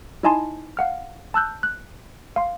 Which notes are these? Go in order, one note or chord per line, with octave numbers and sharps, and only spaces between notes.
D#4 E4 D#5 G#5 A5 C6
F5 F#5 F6
A5 E6 F#6 G6
F#6
F5 C6